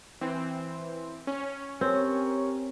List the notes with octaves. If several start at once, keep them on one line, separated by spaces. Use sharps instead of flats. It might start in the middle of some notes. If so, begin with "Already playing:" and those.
E3 C4
C#4
C4 G4 A#4 C#5